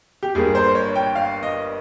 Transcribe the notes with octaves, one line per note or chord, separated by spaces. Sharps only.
G4
G1 G2 G3 A#3 G#4
C5
C#5
G5
F5
D#5